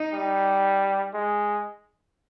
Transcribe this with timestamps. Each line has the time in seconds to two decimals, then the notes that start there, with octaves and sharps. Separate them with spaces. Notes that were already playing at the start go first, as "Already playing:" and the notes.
Already playing: D#4
0.13 G3
1.14 G#3